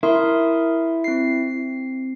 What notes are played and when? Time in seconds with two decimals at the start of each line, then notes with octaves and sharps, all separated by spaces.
0.03 E4 A#4 C6 D#6
1.04 C4 C7